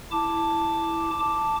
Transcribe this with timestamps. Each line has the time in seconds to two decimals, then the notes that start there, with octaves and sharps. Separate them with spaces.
0.11 E4 A5 D6
1.19 A5 D6